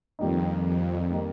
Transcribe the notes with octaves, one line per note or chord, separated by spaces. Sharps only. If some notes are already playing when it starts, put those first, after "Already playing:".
F2 D#3 G3 A#3 D#4
F2
D#3 G3 A#3 D#4